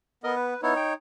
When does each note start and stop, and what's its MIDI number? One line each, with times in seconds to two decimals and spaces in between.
0.24 0.54 59
0.24 0.35 70
0.24 0.35 75
0.36 0.61 71
0.63 0.74 59
0.63 0.94 63
0.63 0.74 64
0.63 0.94 73
0.77 0.93 79